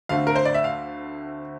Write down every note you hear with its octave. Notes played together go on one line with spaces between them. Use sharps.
D2 D3 A3 C4 F5
A#4
C5
D5
E5
F5